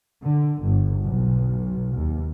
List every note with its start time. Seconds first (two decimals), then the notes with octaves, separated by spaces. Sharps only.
0.23 D3
0.62 G1
1.04 B1
1.97 D#2